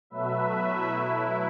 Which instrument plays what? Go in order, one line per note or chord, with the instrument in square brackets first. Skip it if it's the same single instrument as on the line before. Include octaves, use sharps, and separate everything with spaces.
[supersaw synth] B2 F#3 A3 B4 E5
E4